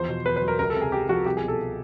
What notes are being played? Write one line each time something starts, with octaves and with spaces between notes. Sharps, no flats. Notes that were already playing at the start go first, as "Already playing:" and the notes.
Already playing: E2 F3 C5
B2
E2 B4
B4
F#3
A#4
C#2 A#4
A4
C3
G#4
C#2 G4
F3 F#4
C2 G4
G#4
B2
A4